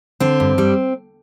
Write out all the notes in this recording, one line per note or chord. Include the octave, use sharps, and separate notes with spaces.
D3 C4
G2
G3